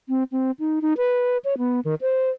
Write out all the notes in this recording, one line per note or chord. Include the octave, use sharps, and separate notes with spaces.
C4
C4
D#4
D#4
B4
C#5
B3
D#3
C5